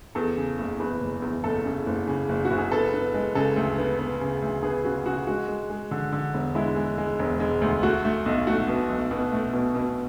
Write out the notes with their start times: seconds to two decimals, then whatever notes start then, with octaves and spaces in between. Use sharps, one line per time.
0.15 E2 A4
0.37 C#3
0.59 F#1
0.80 E2 B4
1.00 F#1
1.22 E2
1.44 F#1 A4
1.64 C#3
1.86 F#1
2.07 C#3
2.29 F#1
2.45 F#4
2.50 F#1
2.58 G#4
2.71 B3 A4
2.93 B3
3.14 G#3
3.35 C#3 A4
3.56 D2
3.78 B3
3.99 B3
4.21 C#3
4.42 D2
4.63 B3 G#4
4.84 C#3 F#4
5.06 C#3 F#4
5.27 G#3 F#4
5.49 G#3
5.70 G#3
5.91 D3
6.12 D3
6.34 E1
6.55 G#3 E4
6.76 G#3
6.98 G#3
7.19 E1
7.40 G#3
7.62 D2
7.83 A3 F#4
8.05 A3
8.26 B1
8.47 A3 F#4
8.68 B2
8.89 B1
9.11 B2
9.33 A3
9.54 B2
9.75 B2